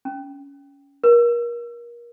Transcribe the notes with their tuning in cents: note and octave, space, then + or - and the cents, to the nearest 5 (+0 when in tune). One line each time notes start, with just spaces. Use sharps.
C#4 +20
A#4 +30